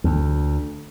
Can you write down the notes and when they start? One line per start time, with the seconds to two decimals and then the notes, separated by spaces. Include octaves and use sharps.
0.04 D2